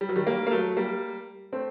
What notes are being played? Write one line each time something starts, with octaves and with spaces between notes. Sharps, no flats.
G3
F#3
D#3 G3
G3 A#3
A#3
F#3 A3
G3 A#3
A3 C4